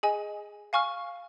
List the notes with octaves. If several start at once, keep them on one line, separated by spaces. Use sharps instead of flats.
G#4 D#5 G#5
F5 G#5 C#6 F6